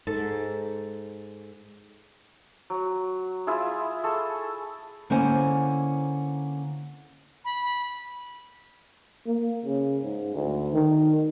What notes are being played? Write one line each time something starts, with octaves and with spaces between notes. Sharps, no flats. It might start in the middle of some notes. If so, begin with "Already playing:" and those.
G#2 A4
F#3
E4 F4 G#4 E5
G#4 A4 C#6 E6
D3 A#3 C#4 E4 C5 G#5
B5
A#3
C#3
G#2
D2
D#3